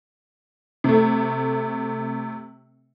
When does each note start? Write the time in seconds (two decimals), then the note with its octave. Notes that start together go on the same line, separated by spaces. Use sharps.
0.84 C3 A3